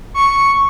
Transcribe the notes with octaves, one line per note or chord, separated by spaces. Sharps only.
C#6